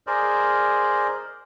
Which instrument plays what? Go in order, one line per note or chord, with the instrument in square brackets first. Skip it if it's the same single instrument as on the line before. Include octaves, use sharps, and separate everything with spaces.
[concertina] G#4 A#4 C5 D5 D#5